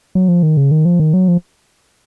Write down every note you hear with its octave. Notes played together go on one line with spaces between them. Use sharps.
F#3
F3
D#3
C#3
D#3
F3
D#3
F#3
F3